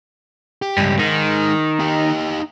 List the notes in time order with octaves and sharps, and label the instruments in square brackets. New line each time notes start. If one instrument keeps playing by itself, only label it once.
[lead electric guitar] G4
[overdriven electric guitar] C#2 G2
[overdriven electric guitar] D#3 [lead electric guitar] G#3 D#4
[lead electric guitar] D#4 G4